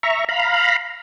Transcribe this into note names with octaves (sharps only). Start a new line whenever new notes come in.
E5 A#5 C#6
F5 A#5 B5